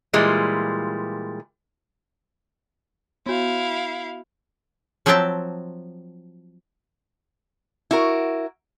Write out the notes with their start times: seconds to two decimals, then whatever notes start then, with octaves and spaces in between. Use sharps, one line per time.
0.13 A#2 E3 G3 G#3 F4
3.26 B3 E4 F#4 F5
5.06 F3 F#3 C4 E5 G5 A5
7.91 E4 F#4 A#4